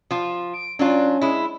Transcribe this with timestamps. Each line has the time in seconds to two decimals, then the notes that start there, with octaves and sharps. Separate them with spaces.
0.11 F3 F4
0.53 D7
0.79 F#3 C#4 D4 F4
1.21 G#3 E4